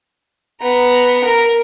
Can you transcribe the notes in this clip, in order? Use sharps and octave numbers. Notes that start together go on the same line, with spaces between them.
B3 A#5
A#4